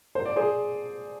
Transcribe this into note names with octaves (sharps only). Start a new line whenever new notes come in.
C5
D5
G#4 C5